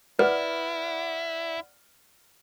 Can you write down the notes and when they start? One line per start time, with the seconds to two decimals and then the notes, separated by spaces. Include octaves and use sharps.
0.19 E4 B4 D5 F#5 F6